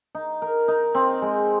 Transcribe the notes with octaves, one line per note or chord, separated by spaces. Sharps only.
D#4
A#4
D#4
C4
G#3